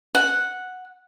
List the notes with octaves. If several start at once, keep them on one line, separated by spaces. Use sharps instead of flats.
F#5